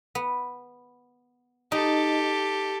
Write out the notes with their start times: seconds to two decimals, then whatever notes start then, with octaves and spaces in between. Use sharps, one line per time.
0.15 B3
1.72 D#4 G4 A4